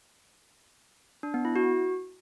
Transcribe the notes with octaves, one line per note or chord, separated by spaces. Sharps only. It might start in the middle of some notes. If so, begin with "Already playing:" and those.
D4
B3
E4
F#4